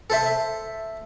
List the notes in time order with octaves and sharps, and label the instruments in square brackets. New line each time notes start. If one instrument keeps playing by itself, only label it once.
[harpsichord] A4 C5 E5